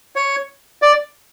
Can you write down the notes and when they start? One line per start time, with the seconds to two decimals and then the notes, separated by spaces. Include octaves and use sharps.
0.16 C#5
0.82 D5